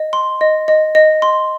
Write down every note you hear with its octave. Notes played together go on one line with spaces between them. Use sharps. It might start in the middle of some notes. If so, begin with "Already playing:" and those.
Already playing: D#5
C6
D#5
D#5
D#5
C6